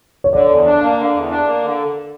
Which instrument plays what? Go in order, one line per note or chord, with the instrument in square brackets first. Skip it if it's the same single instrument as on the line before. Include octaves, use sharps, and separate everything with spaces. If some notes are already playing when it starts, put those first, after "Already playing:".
[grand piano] C#5
[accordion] D3 [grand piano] D5
[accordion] E2
D4
A#3
D3
E2
D4
A#3
D3